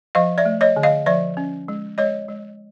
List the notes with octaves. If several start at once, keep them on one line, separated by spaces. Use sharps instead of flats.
F3 D#5 F5
D5 E5
A3
C#5 D#5
D3
D#5 F5
F3 D5 E5
C#4
G#3
G#3 C#5 D#5
G#3